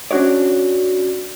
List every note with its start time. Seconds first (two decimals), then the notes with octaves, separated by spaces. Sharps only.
0.11 C#4 D4 F#4 C#5 D5